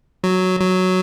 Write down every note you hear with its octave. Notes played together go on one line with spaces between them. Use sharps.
F#3
F#3